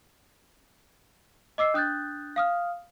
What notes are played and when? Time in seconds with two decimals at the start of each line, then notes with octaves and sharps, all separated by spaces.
1.58 D#5 D6 E6 C7
1.74 D4 D#6 F#6 G6 A6
2.36 F5 D#6 F6